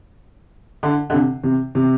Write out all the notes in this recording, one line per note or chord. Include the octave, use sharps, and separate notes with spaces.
D3
D3
C3
C3
C3